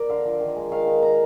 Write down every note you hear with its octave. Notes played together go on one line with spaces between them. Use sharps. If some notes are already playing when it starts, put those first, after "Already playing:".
Already playing: A#4 D5
D3 F5
F3
D#3
G#3
D#3 F5
D#3
A#5